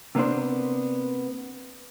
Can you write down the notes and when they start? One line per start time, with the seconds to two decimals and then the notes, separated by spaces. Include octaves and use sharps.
0.15 C3 A#3 B3 D4 C5